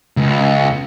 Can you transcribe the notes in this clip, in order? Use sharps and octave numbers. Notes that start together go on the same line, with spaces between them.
C#2